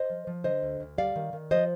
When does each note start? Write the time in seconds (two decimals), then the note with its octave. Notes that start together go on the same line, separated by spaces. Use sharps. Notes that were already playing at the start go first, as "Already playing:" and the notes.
Already playing: C5 D#5
0.10 F3
0.27 F3
0.44 D3 C5 D#5
0.63 D2
0.80 D2
0.98 G3 D5 F5
1.16 D#3
1.33 D#3
1.51 F3 C5 D#5